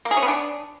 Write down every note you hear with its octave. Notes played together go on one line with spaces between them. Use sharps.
A#3
G#4
C#4
B3
D4